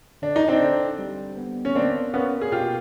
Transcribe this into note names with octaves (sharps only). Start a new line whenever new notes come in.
D3 D4
D#4
C4 D4
D3
G3
B3
C#4
A#3 C4 D4
A#3 B3 C#4
G#4
B2 F4 G4